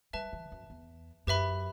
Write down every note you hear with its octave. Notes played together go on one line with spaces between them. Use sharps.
G3 B4 E5 A5
E3
F#2
E2
F#2 G4 B4 E5 B5